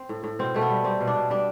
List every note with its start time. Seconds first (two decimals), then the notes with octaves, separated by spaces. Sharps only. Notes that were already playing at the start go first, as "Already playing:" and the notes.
Already playing: C4
0.09 A2
0.24 A2
0.39 B2 C4
0.54 B2 A3
0.61 B3
0.70 G3
0.84 G3 C4
1.01 B2
1.07 D4
1.16 B2
1.30 G3 D4